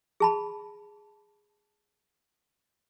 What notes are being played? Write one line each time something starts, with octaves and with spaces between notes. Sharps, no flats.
G#4 A5 B5